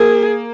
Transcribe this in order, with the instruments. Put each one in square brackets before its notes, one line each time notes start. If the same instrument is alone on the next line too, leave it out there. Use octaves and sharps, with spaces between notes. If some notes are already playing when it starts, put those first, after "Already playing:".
Already playing: [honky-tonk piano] A#3 [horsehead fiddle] G#4